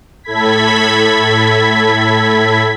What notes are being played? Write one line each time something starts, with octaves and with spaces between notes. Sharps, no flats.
A2 A4 B5 G#6 B6